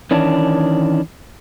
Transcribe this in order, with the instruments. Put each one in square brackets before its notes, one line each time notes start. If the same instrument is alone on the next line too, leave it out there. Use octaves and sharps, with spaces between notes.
[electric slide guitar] D#3 E3 C#4 D4